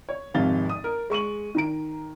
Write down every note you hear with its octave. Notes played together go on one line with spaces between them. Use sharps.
C#5
G#1 F2 C3 F5 A6 G7
D#6
A#4
G#3 C#6 D#7 F#7
D#3 A#5 D7